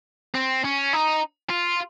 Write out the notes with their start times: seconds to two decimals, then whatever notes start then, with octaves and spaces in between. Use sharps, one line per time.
0.34 C4
0.64 C#4
0.93 D#4
1.50 F4